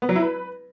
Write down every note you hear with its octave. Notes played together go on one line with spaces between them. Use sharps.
B3
F#3
E4
B4